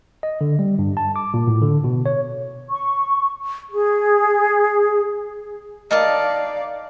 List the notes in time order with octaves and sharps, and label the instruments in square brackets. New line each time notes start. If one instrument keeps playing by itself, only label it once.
[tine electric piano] D#5
D3
G3
G2
A5
D6
A#2
A2
D3
B2
C#5
[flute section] C#6
G#4
[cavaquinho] D#4 A#4 A5 [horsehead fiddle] D5 F5